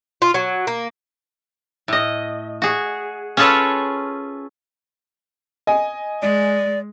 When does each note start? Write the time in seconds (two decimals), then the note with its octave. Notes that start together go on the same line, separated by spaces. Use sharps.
0.22 F4
0.34 F#3
0.67 A#3
1.88 A2 D#5
2.62 F#4 G#4
3.37 C#4 F4 G#4 A4 B4 C#5
5.67 D#5 G#5
6.22 G#3 D5